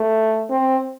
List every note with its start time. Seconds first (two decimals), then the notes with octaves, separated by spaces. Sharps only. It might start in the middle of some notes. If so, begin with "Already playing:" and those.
Already playing: A3
0.50 C4